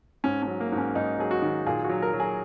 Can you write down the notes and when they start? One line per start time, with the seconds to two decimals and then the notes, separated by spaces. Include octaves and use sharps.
0.24 G#2 C#4
0.43 F#3 C#4
0.60 A#3
0.72 G#2
0.78 C#4
0.95 G#2 D#4
1.19 F#3 G#4
1.31 F#4
1.42 D#3
1.66 A#2 G#4
1.84 F#4
1.89 F#3
2.02 A#4
2.13 F#3
2.20 G#4